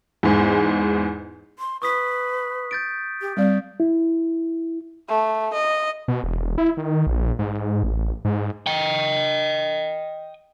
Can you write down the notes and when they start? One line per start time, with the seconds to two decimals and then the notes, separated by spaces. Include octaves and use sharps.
0.23 E2 G#2
1.59 C6
1.82 B4 C#6 D#6 B6
2.71 G6 A6 D7
3.21 G4
3.37 G3 C4 D5 F5
3.80 E4
5.09 A3
5.53 D#5
6.08 B2
6.24 E1
6.58 E4
6.77 D#3
7.07 A#1
7.39 G#2
7.83 A1
8.25 G#2
8.67 D#5 G5